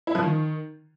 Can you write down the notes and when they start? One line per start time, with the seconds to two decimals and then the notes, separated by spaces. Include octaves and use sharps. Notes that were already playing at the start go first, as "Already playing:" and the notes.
0.07 E4
0.15 F3
0.23 D#3